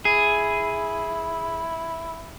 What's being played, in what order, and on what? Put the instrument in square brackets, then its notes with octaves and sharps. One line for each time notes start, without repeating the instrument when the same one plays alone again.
[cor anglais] E4 [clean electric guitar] G#4